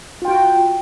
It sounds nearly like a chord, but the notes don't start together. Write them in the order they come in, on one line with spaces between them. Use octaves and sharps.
F4 G5 F#4